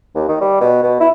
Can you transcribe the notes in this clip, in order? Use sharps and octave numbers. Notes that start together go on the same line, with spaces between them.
D#2
D#3
G3
B2
B2
E4